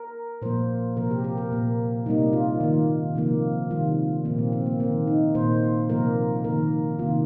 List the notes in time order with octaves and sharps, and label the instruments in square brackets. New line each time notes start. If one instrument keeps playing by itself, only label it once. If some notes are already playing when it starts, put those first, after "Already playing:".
Already playing: [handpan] A#4
A#2 F3 A#3 C5
C3 F3 A#3 A#4
G4
G4
A#4
A#2 A#3
C3 G3 A#3 D#4
F4
D#3 A#3
C3 F3 A#3
C3 D#3 G3 F4
A#2 F3 A#3 C4
C4
C4
A#3
D#3 A#3 C4
D#4
A#2 A#3 C5
C3 F3 A#3 A#4
D#3 A#3 A#4
C3 D#3 A#3 F4